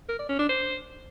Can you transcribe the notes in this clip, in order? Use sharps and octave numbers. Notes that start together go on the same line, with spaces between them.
A#4
D5
C#4
D4
C5